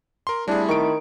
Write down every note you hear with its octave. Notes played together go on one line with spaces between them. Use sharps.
A#4 C6
G3 A3 C4 D4 E4 G#4
D#3 C#6 D7